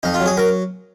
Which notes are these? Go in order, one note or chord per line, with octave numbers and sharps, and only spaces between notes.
F2 D#4
F4
F#3
G#4
F#3 A#4